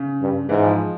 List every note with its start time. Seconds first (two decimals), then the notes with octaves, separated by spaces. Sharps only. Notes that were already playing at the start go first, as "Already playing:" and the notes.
Already playing: C#3
0.21 G2
0.49 G#2 E3
0.63 F3